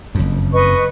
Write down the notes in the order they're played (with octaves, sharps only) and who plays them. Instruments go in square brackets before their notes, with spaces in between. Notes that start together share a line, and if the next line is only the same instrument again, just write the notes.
[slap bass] F#1 F2
[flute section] B4 D#5 C#6